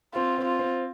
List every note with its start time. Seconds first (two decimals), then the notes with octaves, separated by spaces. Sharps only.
0.14 C4 F4
0.38 C4
0.45 F4
0.59 C4